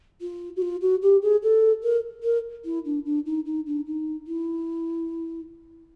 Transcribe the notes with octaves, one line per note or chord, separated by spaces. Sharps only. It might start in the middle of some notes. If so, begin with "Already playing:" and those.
F4
F#4
F4
F#4
G4
G#4
A4
A#4
A#4
E4
D4
D4
D#4
D#4
D4
D#4
E4